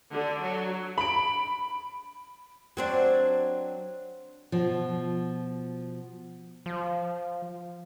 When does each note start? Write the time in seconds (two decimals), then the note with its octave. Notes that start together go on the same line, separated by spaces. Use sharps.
0.12 D3
0.42 F#3
0.98 B5 D7
2.77 F#3 C4 D4
4.52 B2 F3
6.66 F3